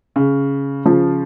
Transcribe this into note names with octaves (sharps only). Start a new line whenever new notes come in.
C#3
C#3 F3